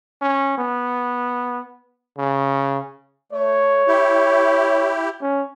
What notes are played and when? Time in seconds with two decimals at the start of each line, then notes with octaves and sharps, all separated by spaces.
0.22 C#4
0.58 B3
2.18 C#3
3.32 A3 C#5
3.87 E4 G4
5.21 C#4